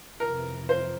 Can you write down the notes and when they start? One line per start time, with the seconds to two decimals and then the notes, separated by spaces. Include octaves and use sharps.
0.20 F2 C3 E3 A#4
0.69 C5